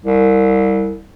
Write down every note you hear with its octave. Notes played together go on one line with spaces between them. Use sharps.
C2